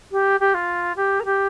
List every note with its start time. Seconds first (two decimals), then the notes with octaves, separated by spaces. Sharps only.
0.11 G4
0.40 G4
0.54 F4
0.96 G4
1.20 A#4
1.25 G4